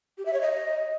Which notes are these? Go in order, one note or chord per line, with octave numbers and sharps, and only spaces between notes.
G4
E5
C#5
D#5